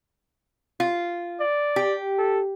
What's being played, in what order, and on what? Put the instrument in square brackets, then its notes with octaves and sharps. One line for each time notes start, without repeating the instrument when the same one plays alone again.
[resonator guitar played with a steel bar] F4
[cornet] D5
[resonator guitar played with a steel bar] G4
[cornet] A4